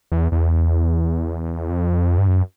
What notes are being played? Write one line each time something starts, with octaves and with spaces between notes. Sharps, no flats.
E2
E2
F2
G2
F#2